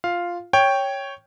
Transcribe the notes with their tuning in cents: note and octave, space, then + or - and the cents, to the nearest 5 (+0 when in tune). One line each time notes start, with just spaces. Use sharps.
F4 +0 F5 +0
C#5 +0 G5 +0